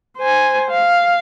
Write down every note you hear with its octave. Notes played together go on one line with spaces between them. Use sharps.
C5 G#5
F5